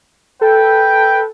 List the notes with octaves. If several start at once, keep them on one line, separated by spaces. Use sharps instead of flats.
A4 B4 G5